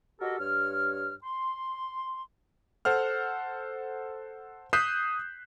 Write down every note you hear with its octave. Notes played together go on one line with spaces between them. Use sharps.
F#4 G4 A4 A#4 D#5
G2 C#5 F6
C6
A4 C5 F#5 F6
D#6 F#6 G6 B6 C7 E7